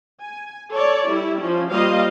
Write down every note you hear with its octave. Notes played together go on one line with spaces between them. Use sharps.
G#5
A4 C#5 D5
G3 E4
F3 C#4
G3 A#3 F4 C5 D#5 F5